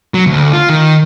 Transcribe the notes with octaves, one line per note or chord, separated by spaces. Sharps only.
F#3
D2
F4
D#3